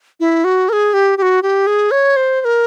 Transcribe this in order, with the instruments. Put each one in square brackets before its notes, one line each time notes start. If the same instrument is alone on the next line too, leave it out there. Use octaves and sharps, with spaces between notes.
[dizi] E4
F#4
A#4
G#4
G4
G4
F#4
G4
G#4
C#5
C5
C5
A#4